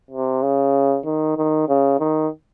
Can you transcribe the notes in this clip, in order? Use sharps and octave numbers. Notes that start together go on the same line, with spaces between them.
C3
C#3
D#3
D#3
C#3
D#3